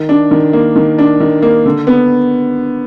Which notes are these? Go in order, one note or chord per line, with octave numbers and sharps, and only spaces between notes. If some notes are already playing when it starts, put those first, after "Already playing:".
Already playing: D#3
D4
D#3
A#3
D#3
D4
D#3
A#3
D3
B3